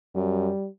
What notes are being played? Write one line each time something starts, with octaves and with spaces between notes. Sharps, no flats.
F#2 G3